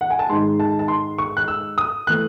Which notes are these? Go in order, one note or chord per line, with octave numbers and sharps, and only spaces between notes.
F#5
G#5
A5
G#2 D#3 G#3 C6
A5
A5
C6
C#6
F#6
E6
D#6
E3 A3 F#6